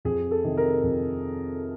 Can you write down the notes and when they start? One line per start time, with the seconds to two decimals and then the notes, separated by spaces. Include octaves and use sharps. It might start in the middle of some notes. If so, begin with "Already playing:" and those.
0.05 F2 G#4
0.31 A4
0.44 C3 D#3
0.57 A#4
0.83 F2